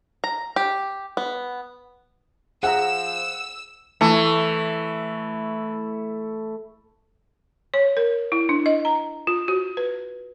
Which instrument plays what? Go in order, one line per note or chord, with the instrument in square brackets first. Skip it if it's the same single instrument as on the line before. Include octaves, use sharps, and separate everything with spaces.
[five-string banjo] A#5
G4
B3
[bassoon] F3 [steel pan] G#4 E5 A#5 [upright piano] F#5 [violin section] E6
[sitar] E3 [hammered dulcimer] A3
[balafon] C#5
A#4
E4
D4
D#5
A#5
F4
F#4
B4